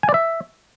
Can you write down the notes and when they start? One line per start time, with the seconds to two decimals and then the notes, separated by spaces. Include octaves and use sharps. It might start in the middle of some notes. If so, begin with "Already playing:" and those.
0.03 G#5
0.09 D5
0.14 E5